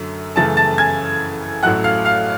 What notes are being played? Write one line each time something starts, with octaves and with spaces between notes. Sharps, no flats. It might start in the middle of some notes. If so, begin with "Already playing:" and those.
Already playing: F#2 D3 F#3 A3
F#2 C#3 E3 A3 A5 A6
A5 A6
G#5 G#6
A1 A2 F#3 A3 F#5 F#6
F5 F6
F5 F6